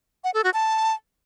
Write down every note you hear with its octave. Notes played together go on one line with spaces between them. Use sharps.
F#5
A4
F#4
A5